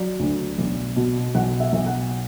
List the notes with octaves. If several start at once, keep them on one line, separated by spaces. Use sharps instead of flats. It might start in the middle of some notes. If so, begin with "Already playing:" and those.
Already playing: F#3 D5
D2
B1
B2
B1 F#5
E5
B1
F#5